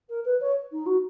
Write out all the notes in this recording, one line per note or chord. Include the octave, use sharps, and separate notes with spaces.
A#4
B4
C#5
D#4
F#4